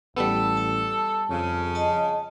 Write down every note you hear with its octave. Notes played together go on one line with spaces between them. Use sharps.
A1 G3 B3 A4
A5
F2 C#3
D#5 A5